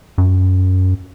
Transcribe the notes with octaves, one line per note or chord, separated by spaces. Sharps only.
F#2